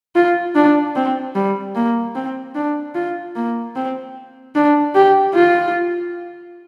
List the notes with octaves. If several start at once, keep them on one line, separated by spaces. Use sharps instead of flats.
F4
D4
C4
G3
A#3
C4
D4
F4
A#3
C4
D4
G4
F4